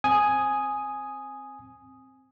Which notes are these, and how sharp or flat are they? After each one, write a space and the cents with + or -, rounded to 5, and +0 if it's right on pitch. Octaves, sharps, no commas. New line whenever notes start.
C4 +0 G#5 +5 D#6 +0